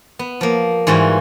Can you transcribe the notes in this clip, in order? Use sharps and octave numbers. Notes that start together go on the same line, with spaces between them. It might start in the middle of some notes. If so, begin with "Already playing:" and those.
B3
F3 A#3
G#2 E3 G3 F4 F#4